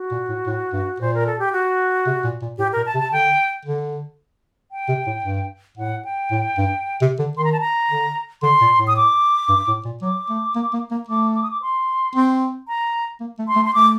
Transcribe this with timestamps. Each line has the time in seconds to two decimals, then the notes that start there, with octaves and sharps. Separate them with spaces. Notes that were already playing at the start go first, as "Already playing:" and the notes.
Already playing: F#4
0.11 A#2
0.29 A2
0.47 A2
0.73 G2
1.00 A#2 C5
1.14 A#4
1.26 A4
1.39 G4
1.52 F#4
2.06 C3
2.24 A#2
2.42 A#2
2.58 A2 G4
2.73 A#2 A#4
2.86 A5
2.94 C3
2.99 A5
3.12 D3 G5
3.65 D3
4.72 G5
4.88 C3
5.07 A2
5.24 G2
5.77 A2 F#5
6.05 G5
6.31 A2
6.57 G2
7.01 C3
7.19 D3
7.37 D#3 C6
7.44 A#5
7.53 A5
7.60 A#5
7.90 D3
8.42 D3 C6
8.61 A#2
8.79 A2
8.87 D#6
8.97 D6
9.49 G2
9.67 A2
9.85 A#2
10.02 F#3 D6
10.29 A3
10.55 A#3
10.73 A#3
10.91 A#3
11.09 A3 D6
11.35 D6
11.43 D#6
11.51 D6
11.62 C6
12.15 C4
12.68 A#5
13.20 A#3
13.39 A3
13.48 C6
13.56 A3
13.65 C6
13.74 A3 D6